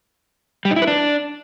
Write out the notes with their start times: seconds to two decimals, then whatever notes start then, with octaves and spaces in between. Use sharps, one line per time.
0.65 G3
0.71 D#4
0.76 E4
0.82 B4
0.88 D4